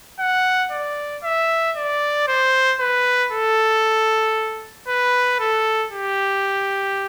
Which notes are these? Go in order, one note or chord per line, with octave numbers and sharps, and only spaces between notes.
F#5
D5
E5
D5
C5
B4
A4
B4
A4
G4